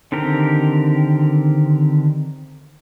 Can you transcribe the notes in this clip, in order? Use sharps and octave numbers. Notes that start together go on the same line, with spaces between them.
D3 D#3 C4 G4 A#4